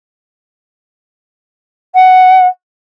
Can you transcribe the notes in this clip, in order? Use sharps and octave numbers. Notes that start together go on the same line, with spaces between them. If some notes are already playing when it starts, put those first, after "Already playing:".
F#5